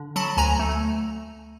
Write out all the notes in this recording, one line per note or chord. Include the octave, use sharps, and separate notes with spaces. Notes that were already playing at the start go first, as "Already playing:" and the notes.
Already playing: D3
F#3 A5 B5
D2 G#5 A#5
A3